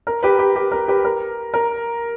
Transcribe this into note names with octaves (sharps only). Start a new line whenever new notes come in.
A#4
G4 B4
G4
G4
A#4
G4 B4
A#4
A#4